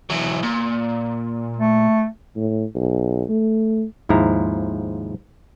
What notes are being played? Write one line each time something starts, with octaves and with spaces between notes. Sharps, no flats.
E3 F#3
A#2
A3
A2
B1
A3
D#2 G#2 F3 E4 A#5